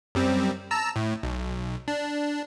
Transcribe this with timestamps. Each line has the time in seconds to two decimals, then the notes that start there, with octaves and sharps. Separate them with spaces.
0.15 F#2 G3 C4
0.71 A5 A#5 E6
0.96 A2
1.23 B1
1.88 D4